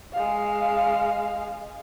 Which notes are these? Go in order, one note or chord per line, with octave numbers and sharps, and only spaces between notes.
G#3 F5